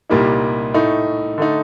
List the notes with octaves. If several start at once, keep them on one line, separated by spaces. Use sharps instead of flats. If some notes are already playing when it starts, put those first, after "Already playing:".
C2 A#2 G3 A#3 D#4
A2 A3 D#4
D3 A3 D#4